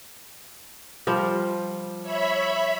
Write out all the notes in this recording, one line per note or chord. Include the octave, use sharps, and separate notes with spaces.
F3 G3
C#5 E5 B5